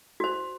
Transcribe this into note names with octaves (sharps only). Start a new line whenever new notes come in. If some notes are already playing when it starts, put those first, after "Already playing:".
F#4 C5